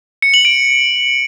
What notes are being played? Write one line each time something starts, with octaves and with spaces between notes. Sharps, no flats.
C#7
F#7
D7